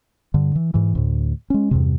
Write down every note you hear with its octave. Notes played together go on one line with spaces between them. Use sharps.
G2 D3
E3
G#2 E3
D2 A2
G#3 C#4
E2 G2 C3